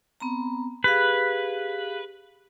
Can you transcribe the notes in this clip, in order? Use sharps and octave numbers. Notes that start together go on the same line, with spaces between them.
B3 C4 A#5
G4 G#4 B4 F5